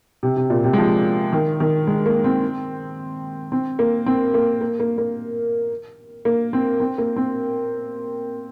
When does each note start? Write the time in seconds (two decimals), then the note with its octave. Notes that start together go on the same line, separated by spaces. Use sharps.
0.23 C3
0.37 C3
0.50 A#2
0.64 C3
0.73 G#3
0.78 F3
1.33 D#3
1.60 D#3
1.87 G#3
2.06 A#3
2.24 C4
3.52 C4
3.79 A#3
4.06 C4
4.34 A#3
4.61 A#3
4.80 A#3
4.98 A#3
6.25 A#3
6.53 C4
6.80 C4
6.98 A#3
7.16 C4